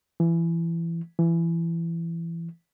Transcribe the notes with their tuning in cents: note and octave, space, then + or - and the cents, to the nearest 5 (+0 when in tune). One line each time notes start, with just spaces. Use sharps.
E3 +20
E3 +20